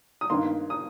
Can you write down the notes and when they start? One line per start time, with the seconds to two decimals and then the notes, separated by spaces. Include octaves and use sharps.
0.21 D#6
0.30 G2 D#3 A#3 C6
0.70 D#6